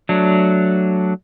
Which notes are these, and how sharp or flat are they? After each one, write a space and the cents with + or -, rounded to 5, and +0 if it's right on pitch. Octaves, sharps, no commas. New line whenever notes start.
F#3 +0 A3 +0 D4 +0